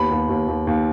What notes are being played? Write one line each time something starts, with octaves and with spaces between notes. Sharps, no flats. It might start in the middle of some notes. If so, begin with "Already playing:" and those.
Already playing: D#2 B3 B5
D#2
D#2
D#2
D#2